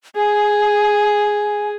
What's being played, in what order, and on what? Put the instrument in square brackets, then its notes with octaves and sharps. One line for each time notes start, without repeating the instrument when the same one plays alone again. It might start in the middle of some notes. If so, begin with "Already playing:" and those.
[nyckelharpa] G#4 [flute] G#5